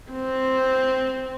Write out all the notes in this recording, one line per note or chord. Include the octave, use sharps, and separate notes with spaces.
C4